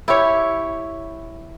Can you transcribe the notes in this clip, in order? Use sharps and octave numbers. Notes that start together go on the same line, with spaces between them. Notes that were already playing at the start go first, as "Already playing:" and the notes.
E4 G4 C#5